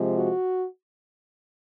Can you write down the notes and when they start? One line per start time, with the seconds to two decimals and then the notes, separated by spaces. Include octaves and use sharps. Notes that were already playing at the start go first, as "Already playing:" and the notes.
Already playing: C3 F3 G#3
0.16 F#4